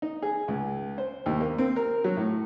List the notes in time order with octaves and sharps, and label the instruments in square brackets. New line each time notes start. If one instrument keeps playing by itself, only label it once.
[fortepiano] D#4
G#4
C#2
C5
D#2
A#3
C4
A#4
F#3
A2